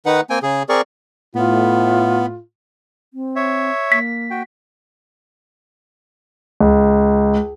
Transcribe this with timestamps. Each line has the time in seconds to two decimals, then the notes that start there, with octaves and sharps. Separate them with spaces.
0.06 D#3 D#4 B4 F#5
0.30 A#3 C4 G5 G#5
0.42 C#3 G#4
0.69 C4 G#4 A#4 D5 C#6
1.35 A2 B3 F4
3.14 C4
3.36 C#5 E5
3.92 A#3 B6
4.30 F#4 G5
6.61 C#2